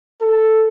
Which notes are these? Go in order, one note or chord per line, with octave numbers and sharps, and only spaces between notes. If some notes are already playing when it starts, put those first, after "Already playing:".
A4